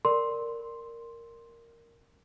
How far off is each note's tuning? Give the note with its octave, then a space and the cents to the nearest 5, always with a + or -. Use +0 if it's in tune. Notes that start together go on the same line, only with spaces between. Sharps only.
A#4 -5 D5 +0 C6 +0